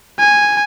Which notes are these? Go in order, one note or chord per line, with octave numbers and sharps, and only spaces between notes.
G#5